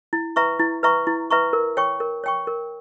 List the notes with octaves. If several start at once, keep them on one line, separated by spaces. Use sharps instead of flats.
E4
B4 E5 A#5 C#6
E4
B4 E5 A#5 C#6
E4
B4 E5 A#5 C#6
A#4
C#5 G5 C#6
A#4
C#5 G5 C#6
A#4